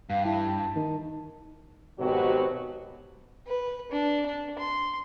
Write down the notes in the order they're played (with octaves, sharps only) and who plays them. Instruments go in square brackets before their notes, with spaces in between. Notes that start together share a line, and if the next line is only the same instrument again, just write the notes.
[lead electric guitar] G2 [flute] F5
[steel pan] E4 [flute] A5
[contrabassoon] D#3
[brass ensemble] G#1 B2 F#3 C4 F#4 G4
[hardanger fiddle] B4
D4
D4
C6